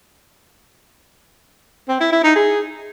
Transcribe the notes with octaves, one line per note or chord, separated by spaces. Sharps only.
C4
E4
E4
D#4
G#4